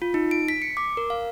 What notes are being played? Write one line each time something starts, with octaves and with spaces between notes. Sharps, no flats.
F4
D#4
D7
B6
C#7
D6
A#4
F5